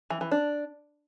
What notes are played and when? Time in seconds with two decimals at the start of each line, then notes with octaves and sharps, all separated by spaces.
0.10 E3
0.21 E3
0.31 D4